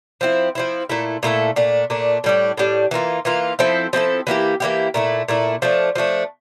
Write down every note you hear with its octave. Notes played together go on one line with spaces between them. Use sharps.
F3 C4 E4
F3 C4 E4
A#2 A3 E4 A4
A#2 A3 E4 A4
A#2 A3 D4
A#2 A3 D4
A2 G3 D4
A2 G3 D4
E3 A#3 F4
E3 A#3 F4
F3 C4 E4 A4
F3 C4 E4 A4
E3 A#3 E4 G4
E3 A#3 E4 G4
A#2 A3 E4
A#2 A3 E4
F3 A3 D4
F3 A3 D4